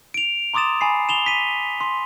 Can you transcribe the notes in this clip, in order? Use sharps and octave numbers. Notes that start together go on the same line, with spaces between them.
D7 F7
A#5 C6 D6 D#6 A6 E7
G#5 B5 C7
E7 F7 G7
B6 D#7
C6